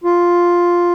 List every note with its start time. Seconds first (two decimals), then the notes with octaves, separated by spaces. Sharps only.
0.04 F4